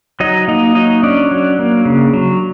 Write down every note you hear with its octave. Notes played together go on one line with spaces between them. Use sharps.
F#3 D#4 D#5
A#3 D#4 D#5
F#3 D#4 D#5
C#4 D4 D5
F#3
A#3
C#3
F#3